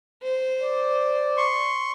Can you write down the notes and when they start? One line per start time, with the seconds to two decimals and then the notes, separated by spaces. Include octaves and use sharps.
0.22 C5
0.61 D5
1.37 C6 C#6